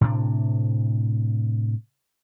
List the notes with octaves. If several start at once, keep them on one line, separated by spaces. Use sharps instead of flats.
A2 C3 D4